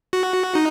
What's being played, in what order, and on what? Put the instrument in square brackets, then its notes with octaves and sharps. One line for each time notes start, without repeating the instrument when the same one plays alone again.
[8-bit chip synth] F#4
D#4